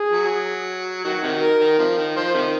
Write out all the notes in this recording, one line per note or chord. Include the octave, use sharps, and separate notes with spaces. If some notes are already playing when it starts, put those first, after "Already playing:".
Already playing: G#4
F#3
D#3 F#3 F#4
C3 D#3
A#4
D#3
C3 F3
D#3
F3 C5
C3 D#3